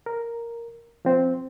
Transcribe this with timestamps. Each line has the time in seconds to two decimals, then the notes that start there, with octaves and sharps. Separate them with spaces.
0.06 A#4
1.05 F3 C4